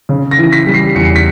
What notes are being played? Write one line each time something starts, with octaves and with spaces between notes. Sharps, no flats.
C#3
A#6
E3
B6
G3
C7
E2 C#7
B6